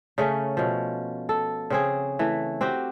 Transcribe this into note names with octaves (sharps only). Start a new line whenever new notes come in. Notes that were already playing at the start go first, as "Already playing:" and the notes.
C#3 A3 C#4
B2 F3
A4
C#3 C4 G#4
E3 A3
C4 F#4 G4